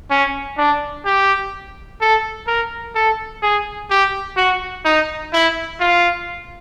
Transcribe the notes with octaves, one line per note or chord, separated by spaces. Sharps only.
C#4
D4
G4
A4
A#4
A4
G#4
G4
F#4
D#4
E4
F4